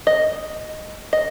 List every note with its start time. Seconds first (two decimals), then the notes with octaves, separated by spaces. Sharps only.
0.07 D#5
1.13 D#5